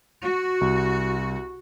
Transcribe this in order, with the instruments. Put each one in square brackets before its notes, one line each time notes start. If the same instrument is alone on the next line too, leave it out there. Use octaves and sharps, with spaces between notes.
[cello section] F#4
[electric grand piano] C2